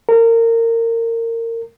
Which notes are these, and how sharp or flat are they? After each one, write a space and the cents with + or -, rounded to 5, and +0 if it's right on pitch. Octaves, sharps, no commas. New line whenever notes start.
A#4 -25